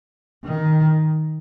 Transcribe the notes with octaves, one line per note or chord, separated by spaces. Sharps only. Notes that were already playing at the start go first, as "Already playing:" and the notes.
D#3